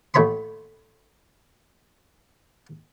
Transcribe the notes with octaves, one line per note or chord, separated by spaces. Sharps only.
A1 A3 C#5 B5 C6